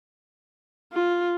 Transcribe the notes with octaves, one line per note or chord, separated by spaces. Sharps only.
F4